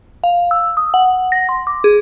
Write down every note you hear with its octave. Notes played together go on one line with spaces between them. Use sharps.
F5
E6
D#6
F#5
A#6
C6
D6
G#4